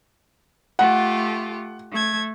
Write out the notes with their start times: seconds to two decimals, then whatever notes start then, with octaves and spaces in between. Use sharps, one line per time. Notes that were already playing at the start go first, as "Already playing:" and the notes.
0.79 A3 F4 G4 F#5
1.90 A3 G#6